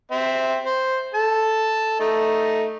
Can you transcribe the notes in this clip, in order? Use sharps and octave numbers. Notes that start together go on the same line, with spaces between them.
C4 E5
C5
A4 A5
A3 D#4